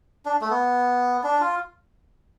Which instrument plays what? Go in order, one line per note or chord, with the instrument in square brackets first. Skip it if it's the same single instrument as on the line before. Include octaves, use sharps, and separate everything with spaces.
[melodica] D4
A3
B3
D4
F4